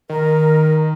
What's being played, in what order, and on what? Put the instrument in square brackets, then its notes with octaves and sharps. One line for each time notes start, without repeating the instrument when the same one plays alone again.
[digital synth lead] D#3 [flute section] A#4